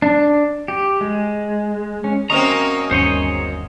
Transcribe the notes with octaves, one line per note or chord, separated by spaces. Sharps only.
D4
G4
G#3
C#4
F#2 A#3 C4 D#5 A#5 C#6 D#6
G1 D#2 C#4 G#4 C5 C#5 D#5